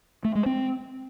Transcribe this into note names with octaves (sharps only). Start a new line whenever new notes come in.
A3
G#3
C4